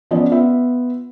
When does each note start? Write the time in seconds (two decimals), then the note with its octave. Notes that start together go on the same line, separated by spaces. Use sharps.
0.11 F3 B3 C#4 D5 D#5
0.32 B3 F4 E5